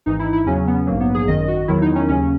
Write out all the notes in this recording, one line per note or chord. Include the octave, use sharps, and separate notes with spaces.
G#1 G#2 E3 D#4
E4
E4
E2 C#3 F#3 C#4
B3
A#1 G#2 F#3 A#3
B3
G#4
G#1 F#2 D#3 D#5
F#4
E2 D#3 F#3 E4
D#4
C#4
D#2 C#3 F#3 C#4